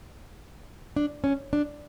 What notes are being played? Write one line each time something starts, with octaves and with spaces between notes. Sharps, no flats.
D4
C#4
D4